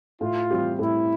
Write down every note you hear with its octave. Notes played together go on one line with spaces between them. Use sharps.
A2 F4
G3 C4 G4
A2 E4